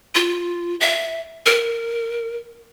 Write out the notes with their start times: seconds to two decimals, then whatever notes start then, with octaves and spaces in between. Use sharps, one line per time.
0.15 F4
0.81 E5
1.46 A#4